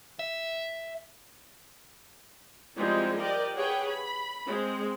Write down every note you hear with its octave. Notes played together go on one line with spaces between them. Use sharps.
E5
F3 G3 G#3 C4 D#4 E4
G4 A#4 D5 D#5
G4 G#4 B4 C#5 F#5 G5
B5
G#3 C4